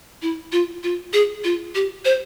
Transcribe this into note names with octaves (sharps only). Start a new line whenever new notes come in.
E4
F4
F4
G#4
F4
G4
C5